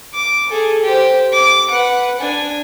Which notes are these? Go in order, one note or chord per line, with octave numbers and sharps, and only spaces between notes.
D6
G#4 A4
G4 C5
D6
B4 F#5
D4 G#5